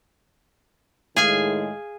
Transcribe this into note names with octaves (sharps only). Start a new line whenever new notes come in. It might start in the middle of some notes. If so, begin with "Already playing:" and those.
A2 D#3 G#3 G#4 F5 G#5